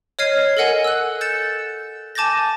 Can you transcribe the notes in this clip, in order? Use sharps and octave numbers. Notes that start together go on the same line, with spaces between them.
C#5 D#5 F6 G#6 C7 D#7
A4 A#4 D#5 F#5 G#5
E6 F#6
G6 A6 C#7 E7
G#5 A5 D6 G6 A6 A#6